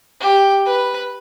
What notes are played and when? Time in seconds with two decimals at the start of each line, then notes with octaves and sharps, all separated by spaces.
0.21 G4
0.66 B4